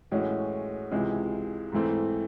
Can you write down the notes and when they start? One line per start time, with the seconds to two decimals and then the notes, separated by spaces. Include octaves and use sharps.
0.11 A2 E3 G#3 C#4 F#4
0.91 C#2 C3 E3 G#3
1.72 G#2 E3 A3 C4